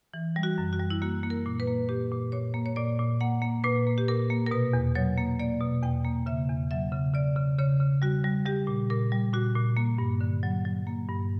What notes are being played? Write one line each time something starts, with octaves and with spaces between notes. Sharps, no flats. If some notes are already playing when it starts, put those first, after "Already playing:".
E3
G3
F#4
F#2
F#4
G3
E4
A#3 F#4
A#3
A#4
A#2
B4
A#3
A#2 G4
A#2
A#2 C#5
A#3
C#5
A#2 D5
A#2
A#3 F#5
A#3
A#2 B4
A#3
G4
A#2 A#4
A#3
A#4
B2 B4
E2
F#3 C#5
A#3
A#3 D5
B2
E2 G5
A#3
C#3 E5
E2
F#3 E5
C#3
C#3 D5
C#3
C#3 C#5
C#3
G3 F#4
G3
G3 G4
A#2
A#2 A#4
G3
A#2 F#4
A#2
A#3
G2
D3
F#3
F#3
A#3
G2